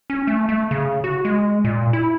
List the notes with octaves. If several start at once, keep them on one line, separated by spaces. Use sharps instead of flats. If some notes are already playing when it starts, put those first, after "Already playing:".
C#4
A3
A3
C#3
F#4
G#3
A#2
E4